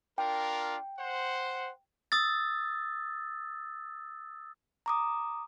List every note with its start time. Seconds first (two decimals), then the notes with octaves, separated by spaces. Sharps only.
0.18 D4 F4 A#4 G5
0.99 C5 F#5
2.12 D#6 E6 A6
4.86 A#5 D6 D#6